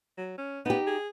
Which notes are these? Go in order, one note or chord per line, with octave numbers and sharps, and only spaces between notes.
F#3
C#4
B3 D#4 G4
G#4